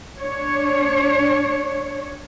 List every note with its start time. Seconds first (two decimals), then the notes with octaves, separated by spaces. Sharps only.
0.19 D4 C#5